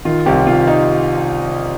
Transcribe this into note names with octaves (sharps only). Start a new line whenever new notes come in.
D#3 F4
C2 G4
C2 F4
D#4